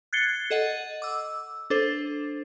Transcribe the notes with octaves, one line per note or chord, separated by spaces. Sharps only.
F#6 G#6 A6 C7 C#7 G7
A4 D#5 F#5
D6 E6
D4 A4 C5